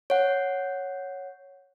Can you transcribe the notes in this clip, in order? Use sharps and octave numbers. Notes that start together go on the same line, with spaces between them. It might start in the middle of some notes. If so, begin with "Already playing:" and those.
C#5 F#5